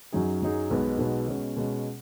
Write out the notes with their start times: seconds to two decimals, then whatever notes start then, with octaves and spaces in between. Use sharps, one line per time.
0.12 F#2 F#3 D#4 G#4
0.42 F#2 F#3 D#4 G#4
0.70 B1 B2 G#3 B3
0.99 B1 B2 G#3 B3
1.28 B2 G#3 C#4
1.57 B2 G#3 C#4